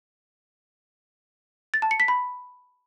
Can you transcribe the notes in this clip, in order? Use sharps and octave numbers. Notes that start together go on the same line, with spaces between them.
A6
A5
C#7
B6
B5